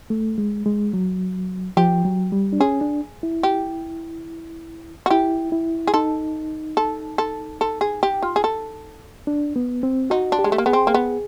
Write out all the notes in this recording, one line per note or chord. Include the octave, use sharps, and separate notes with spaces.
A3
G#3
G#3
F#3
F3 G4
F#3
G3
D4
C#4 G#4
D4
E4
G4
F#4
E4 G4
E4
G#4
D#4 A4
A4
A4
A4
G#4
G4
F4
G#4
A4
D4
B3
C4
D#4 F#4
D4
G4
G#3
A3
A#3
B3 G#4
C4
A#3
B3